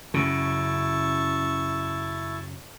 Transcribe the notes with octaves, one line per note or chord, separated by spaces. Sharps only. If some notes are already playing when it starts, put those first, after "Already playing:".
F#2 C#3 E4 A5 C#6